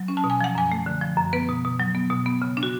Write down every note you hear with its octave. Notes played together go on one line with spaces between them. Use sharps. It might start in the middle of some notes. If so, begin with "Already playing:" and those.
Already playing: F#3
C#4
A5
B2
G#5
F3 F#5
F#2 G#5
A3
D3
F3
F#2
B3 B4
B2
B2
F#3
B3
B2
B3
C#3
D4
F#4